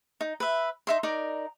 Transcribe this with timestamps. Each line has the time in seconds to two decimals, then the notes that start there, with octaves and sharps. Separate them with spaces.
0.21 D#4
0.40 B4 E5
0.87 D#4 E5 C6
1.03 D#4 A#4 D5 A#5